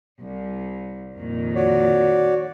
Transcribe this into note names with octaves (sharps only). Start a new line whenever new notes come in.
C2
F2 A#2 D#3
F#4 C#5 D5